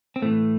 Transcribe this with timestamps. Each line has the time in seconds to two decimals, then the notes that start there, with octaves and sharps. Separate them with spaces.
0.16 C4
0.22 A2 E3 A3